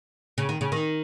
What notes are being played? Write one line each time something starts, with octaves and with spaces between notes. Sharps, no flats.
C#3
D#3
C#3
D#3